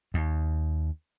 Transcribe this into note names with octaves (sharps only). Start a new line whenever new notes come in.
D#2